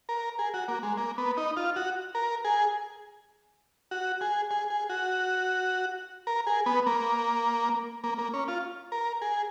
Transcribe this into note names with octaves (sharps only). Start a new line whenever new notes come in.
A#4
G#4
F#4
A#3
G#3
A#3
B3
D#4
F4
F#4
A#4
G#4
F#4
G#4
G#4
G#4
F#4
A#4
G#4
B3
A#3
A#3
A#3
C#4
F4
A#4
G#4